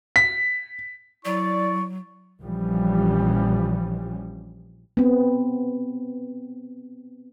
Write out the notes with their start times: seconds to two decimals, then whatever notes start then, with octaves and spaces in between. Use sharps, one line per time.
0.16 B6
1.25 F#3 E4 D5 C#6
2.41 A#1 E3 F3 G3 C#4
4.97 B3 C4